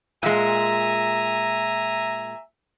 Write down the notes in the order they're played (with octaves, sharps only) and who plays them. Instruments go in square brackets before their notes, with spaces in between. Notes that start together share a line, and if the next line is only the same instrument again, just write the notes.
[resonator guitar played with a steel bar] A#2 G#3 [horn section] E5 G#5 A#5